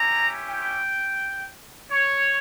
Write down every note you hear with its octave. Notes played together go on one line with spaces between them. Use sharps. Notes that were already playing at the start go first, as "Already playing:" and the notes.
Already playing: C#4 E4 G4 A#5
G5
C#5